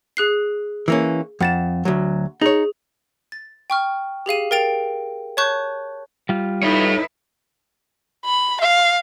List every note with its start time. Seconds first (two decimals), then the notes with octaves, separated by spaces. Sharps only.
0.17 G#4 F#6 C7
0.88 E3 A#3 C#4
1.41 F2 F#5 A6 E7
1.85 D2 F#3
2.41 D#4 G#4 C#5
3.32 A6
3.70 G5 C#6 F6
4.26 G4 G#4 F5 D#7
4.51 A#4 F5 G5 A6 D7 F7
5.37 C#5 A5 C#6 F#6 G6
6.29 G3 F4
6.63 D#4 E4 A4 B4 C#5
8.25 B5
8.61 F5